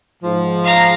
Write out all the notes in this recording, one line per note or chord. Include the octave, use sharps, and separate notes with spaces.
G#2 F3
F5 A#5